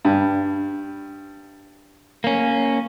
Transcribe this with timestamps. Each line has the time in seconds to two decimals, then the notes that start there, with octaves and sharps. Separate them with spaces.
0.05 G2
2.24 A#3 C#4